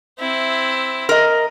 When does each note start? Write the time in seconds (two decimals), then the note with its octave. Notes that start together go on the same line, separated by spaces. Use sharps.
0.19 C4 E4
1.09 A#4 D#5